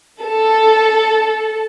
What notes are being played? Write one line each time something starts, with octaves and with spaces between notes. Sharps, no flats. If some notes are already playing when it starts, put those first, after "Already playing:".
A4